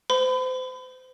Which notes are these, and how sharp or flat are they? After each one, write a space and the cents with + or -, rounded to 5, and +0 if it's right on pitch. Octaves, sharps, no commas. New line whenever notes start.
C5 -30 B5 +40